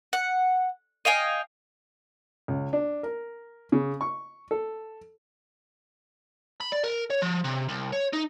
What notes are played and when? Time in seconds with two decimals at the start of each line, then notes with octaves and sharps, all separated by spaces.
0.13 F#5
1.05 D#5 F5 G5 G#5
2.48 C#2
2.73 D4
3.03 A#4
3.72 C#3
4.01 C#6
4.51 A4
6.61 B5
6.72 D5
6.84 A#4
7.10 C#5
7.22 F3
7.45 C3
7.69 C2
7.92 C#5
8.13 D#4